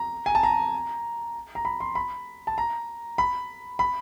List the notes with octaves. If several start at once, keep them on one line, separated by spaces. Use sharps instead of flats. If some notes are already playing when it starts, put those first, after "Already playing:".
Already playing: A#5
G#5
A5
A#5
A#5
B5
C6
B5
A5
A#5
B5
B5